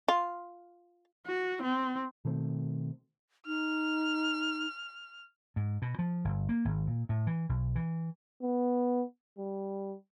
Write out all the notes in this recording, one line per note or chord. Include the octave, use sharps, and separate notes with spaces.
F4
F#4
C4
B2 D#3 A3 C4
D#4 F6
G#2
B2
F3
G1
A#3
G#1
A#2
A2
E3
B1
E3
B3
G3